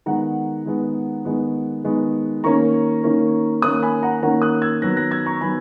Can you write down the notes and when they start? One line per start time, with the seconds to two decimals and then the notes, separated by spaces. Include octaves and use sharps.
0.06 D#3 G#3 B3 F#5 A#5
0.65 D#3 G#3 B3
1.25 D#3 G#3 B3
1.84 D#3 G#3 B3
2.44 D#3 A#3 C#4 A#5 C#6
3.03 D#3 A#3 C#4
3.62 D#3 A#3 C#4 D#6 F#6
3.82 G#5 B5
4.03 F#5 A#5
4.22 D#3 A#3 C#4 F#5 A#5
4.42 D#6 F#6
4.62 E6 G#6
4.81 D#3 F#3 B3 F#6 A#6
4.96 F#6 A#6
5.11 E6 G#6
5.26 A#5 C#6
5.41 D#3 F#3 B3 G#5 B5